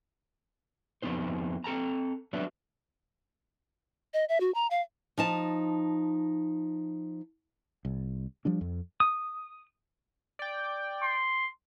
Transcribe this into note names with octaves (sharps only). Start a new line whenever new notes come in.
F2 C#3 B3 D#4 C5
C4 A4 A5 A#5
F#3 B3 D4 B4 E5
D#5
E5
F#4
A#5
F5
F3 D#4 A5
C2
F3 G3 D4
F2
D#6
D5 G5
C6